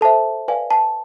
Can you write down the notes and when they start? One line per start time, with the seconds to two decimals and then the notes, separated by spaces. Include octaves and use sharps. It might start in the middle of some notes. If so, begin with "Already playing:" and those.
0.01 A4 C5 E5 A5
0.48 B4 D5 F5 G#5
0.71 A5